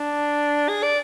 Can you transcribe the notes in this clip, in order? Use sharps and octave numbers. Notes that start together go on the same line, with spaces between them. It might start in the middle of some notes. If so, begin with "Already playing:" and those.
Already playing: D4
G#4
D5